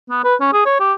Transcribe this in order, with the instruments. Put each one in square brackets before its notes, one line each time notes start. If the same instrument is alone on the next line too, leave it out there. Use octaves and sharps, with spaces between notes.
[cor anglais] B3
B4
C#4
G#4
C#5
G4